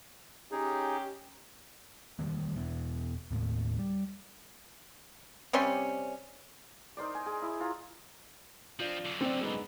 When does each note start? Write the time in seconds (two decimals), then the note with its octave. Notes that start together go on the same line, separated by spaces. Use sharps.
0.52 C#4 D#4 G4 G#4
2.19 D#3 E3 G3 A#3
2.56 E1 E2 B2 E3
3.31 D#2 A2 A3 A#3
3.79 G3
5.53 C3 G3 C#4 C6
6.97 D#4 A#4 C5 D5
7.15 G#5
7.26 G#4
7.42 E4
7.60 F4 A#5
8.80 F3 C4 D4 F4
9.05 F#2 D3
9.21 C4 D4
9.41 G#3 B3 D#4